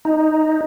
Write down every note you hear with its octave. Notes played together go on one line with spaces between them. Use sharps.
D#4